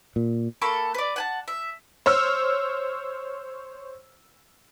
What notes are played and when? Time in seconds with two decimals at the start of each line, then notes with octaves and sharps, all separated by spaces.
0.16 A#2
0.62 A#3 A4 B5 C#6
0.94 B4 D5
1.16 F#5 G#5 A5
1.48 E5
2.06 C5 C#5 E6 F6